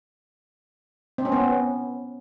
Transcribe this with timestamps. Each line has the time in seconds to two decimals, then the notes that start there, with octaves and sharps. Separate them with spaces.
1.18 C4
1.25 C#4
1.32 B3